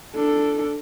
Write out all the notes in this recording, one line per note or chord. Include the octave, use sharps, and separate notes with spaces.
D4 A4